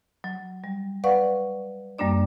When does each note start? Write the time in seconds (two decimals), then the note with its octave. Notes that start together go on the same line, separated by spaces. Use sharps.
0.24 F#3
0.64 G3
1.04 B4 D5 F5 F#5 C#6
1.98 F#2 G3 A#3 D4 D5